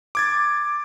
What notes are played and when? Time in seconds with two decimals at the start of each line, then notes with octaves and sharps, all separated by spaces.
0.15 D6 G#6 A6